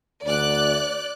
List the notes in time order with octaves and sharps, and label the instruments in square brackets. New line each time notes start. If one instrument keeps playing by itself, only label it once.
[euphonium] D2 [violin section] D5 F#6